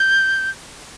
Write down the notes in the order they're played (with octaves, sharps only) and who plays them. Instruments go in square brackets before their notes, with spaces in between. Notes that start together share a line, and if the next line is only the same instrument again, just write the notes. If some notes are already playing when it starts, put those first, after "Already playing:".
Already playing: [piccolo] G6